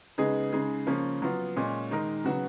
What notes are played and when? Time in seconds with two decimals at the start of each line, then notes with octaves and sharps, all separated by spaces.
0.18 C#3 G#3 B3 D#4 G#4
0.53 C#3 G#3 D#4 G#4
0.87 C#3 F3 A#3 C#4
1.22 F#3 B3 F4
1.56 A#2 G#3 C#4
1.91 D#3 G#3 D#4 A#4
2.24 C#3 F#3 B3 F#4